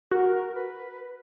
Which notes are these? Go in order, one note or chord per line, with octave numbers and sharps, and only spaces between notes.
F#4 A#4
B4